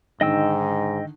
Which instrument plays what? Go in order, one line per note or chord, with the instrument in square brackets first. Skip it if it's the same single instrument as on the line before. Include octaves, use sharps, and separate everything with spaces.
[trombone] G#2 [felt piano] D3 D#3 [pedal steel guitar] D#5 G5 E6